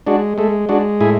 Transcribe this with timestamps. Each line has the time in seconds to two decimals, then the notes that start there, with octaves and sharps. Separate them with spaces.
0.07 G#3 D4 F#4
0.38 G#3 A3
0.69 G#3 D4 F#4
1.01 A2 E4 G#4